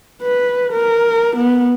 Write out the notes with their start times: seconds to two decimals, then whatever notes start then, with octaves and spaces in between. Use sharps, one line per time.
0.22 B4
0.73 A#4
1.36 B3